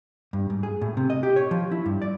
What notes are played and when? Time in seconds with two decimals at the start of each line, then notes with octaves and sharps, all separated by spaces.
0.33 G2
0.50 G#2
0.63 G#4
0.81 A2
0.97 C3
1.10 D#5
1.23 G4
1.36 C#5
1.51 F3
1.72 E4
1.86 G2
2.02 D5